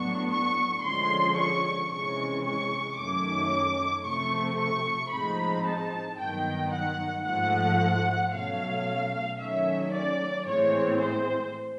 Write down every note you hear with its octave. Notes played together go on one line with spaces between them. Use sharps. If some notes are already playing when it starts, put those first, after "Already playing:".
Already playing: A2 F#3 B3 D4 C#6
C#6
D3 F3 G#3 C#4 C6
C#6
C3 E3 G#3 C#4 C#6
C#6
F#2 D#3 F#3 A3 C#4 D6
C3 F3 A3 C#6
C#6
A2 F3 G#3 C4 D#4 B5
A5
G2 D#3 F#3 B3 G5
F#5
G#2 F3 A3 F#5
B2 F#3 A3 C#4 F5
D#3 F#3 A3 C#4 E5
D5
A2 E3 G#3 C4 C#5
C5